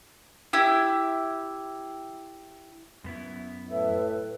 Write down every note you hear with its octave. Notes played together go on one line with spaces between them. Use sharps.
E4 G4
F#2 B3 E4
A2 B4 E5